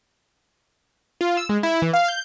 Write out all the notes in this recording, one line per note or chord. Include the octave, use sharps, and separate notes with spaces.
F4
E6
G#3
E4
E3
F5
G6